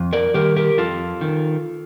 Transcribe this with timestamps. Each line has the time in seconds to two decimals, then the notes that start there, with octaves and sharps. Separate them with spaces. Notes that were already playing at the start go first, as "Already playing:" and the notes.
Already playing: F2
0.13 A#4 D5
0.34 D#3 G3 G4 A#4
0.56 G4 A#4
0.78 F2 F4 A4
1.21 D#3